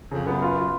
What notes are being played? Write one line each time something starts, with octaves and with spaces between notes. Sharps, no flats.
F2 C#3
F#2 B3
F4
F4